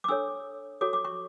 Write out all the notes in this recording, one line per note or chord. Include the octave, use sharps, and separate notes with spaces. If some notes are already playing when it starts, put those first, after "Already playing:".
D6
D4 A4 C#5 E6
F#4 A4 C#5 D6
D6
C#6